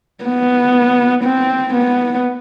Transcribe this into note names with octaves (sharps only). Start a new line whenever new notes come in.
B3
C4
B3